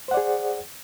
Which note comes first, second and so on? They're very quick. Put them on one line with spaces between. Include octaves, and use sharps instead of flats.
C5 F#5 D5 G#4